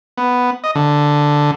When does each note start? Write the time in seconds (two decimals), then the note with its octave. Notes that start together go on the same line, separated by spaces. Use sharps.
0.17 B3
0.64 D#5
0.75 D3